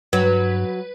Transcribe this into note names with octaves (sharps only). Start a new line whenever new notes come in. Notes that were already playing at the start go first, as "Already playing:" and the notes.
G2 F#3 B4